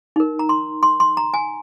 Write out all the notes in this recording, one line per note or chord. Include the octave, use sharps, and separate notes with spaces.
D#4 A#4
A#5
C6
C6
C6
A#5
G#5